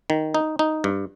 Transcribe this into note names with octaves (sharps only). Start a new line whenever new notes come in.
D#3
D#4
D#4
G2